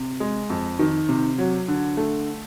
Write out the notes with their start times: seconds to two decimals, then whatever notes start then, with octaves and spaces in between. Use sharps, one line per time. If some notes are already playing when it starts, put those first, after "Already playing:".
Already playing: C3
0.20 G#3
0.50 F2
0.79 D#3
1.09 C3
1.38 F#3
1.68 D3
1.97 A3